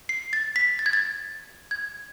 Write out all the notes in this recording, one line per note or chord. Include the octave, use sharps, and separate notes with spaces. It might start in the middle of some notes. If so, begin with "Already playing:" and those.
C7
A6
B6
A6
G#6
A6
G#6